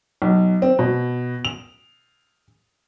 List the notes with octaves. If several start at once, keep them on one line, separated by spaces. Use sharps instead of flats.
B1
C4
B2
F7